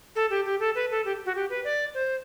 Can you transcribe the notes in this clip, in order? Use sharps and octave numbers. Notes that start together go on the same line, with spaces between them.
A4
G4
G4
A4
B4
A4
G4
F#4
G4
B4
D5
C5